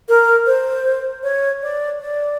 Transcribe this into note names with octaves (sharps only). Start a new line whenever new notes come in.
A#4
C5
C#5
D5
D5